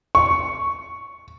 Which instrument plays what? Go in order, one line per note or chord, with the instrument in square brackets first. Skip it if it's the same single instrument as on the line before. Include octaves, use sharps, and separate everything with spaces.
[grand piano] C#6